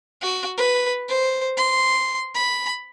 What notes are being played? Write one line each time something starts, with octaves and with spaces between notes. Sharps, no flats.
F#4
B4
C5
C6
B5